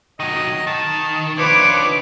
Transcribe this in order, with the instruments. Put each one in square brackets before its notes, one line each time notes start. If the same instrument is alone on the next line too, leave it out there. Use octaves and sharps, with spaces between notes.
[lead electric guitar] D#3 F#3 [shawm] D#5
[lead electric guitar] D#3 [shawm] A5
[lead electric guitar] D#3 D4 [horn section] F3 B4 [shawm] C#5 [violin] D6